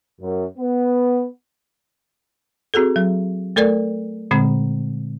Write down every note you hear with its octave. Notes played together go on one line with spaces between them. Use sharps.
F#2
B3
C4 F#4 G#4 A4
F#3
A3 A4 A#4 D5 G#6
A#2 D3 G#3 C4